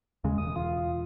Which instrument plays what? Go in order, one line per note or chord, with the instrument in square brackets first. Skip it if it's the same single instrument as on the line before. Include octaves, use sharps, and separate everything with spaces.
[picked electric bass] D#2 C#3 G#3
[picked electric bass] E1 [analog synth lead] D#6
[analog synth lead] F4